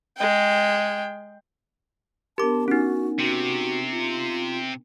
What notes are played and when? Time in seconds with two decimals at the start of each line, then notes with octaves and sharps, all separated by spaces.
0.17 G#3 G5
2.38 B3 D4 G4 A#4 A5 D6
2.68 C#4 D#4 F#4
3.19 C3 F#4
3.92 F4